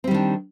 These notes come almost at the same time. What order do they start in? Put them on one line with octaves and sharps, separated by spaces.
C4 G3 D#3 D4